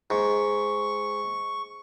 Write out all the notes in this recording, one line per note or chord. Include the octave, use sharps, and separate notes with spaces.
G#2 C#6